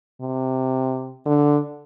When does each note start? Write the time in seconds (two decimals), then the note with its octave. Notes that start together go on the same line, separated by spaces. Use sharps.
0.21 C3
1.26 D3